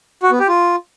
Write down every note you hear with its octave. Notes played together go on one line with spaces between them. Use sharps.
F#4
B3
G4
F4